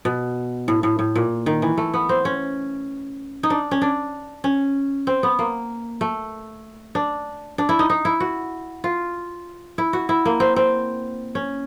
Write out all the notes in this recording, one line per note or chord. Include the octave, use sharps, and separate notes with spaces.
B2
A2
A2
A2
A#2
D#3
E3
A3
B3
C4
C#4
D#4
D4
C#4
D4
C#4
C4
B3
A#3
A3
D4
D4
E4
D#4
D#4
E4
F#4
F4
E4
F#4
E4
A#3
C4
C4
C#4